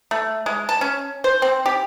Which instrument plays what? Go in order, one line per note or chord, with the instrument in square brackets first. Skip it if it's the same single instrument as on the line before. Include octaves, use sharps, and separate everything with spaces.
[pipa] A3
G#3
A5
C#4
C5
C4
G4